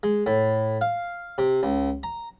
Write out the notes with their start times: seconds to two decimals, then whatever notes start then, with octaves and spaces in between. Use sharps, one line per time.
0.03 G#3
0.26 A2
0.81 F5
1.38 C3
1.63 C#2
2.03 A#5